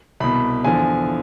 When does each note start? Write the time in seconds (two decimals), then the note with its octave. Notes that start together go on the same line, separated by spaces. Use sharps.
0.20 C2 B2 B5
0.64 E2 D3 F3 G#5